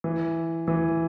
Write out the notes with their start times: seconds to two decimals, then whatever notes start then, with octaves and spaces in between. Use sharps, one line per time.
0.04 E3
0.68 E3